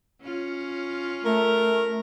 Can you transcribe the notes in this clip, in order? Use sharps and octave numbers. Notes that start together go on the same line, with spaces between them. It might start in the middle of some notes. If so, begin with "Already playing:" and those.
C#4 F4
A3 A#4